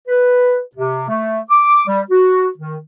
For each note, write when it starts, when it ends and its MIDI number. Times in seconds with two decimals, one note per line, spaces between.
0.08 0.59 71
0.76 1.06 48
1.09 1.40 57
1.50 1.83 86
1.87 2.01 55
2.10 2.49 66
2.58 2.78 51